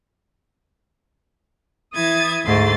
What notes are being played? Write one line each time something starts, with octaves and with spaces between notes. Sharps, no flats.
E3 E4 D#6 G#6 A6
D2 G#2 A3 C6 A6